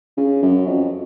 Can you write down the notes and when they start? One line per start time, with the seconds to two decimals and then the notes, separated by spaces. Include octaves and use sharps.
0.17 C#3
0.42 F#2
0.66 F2